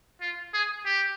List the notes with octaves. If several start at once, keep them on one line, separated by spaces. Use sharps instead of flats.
F4
G#4
G4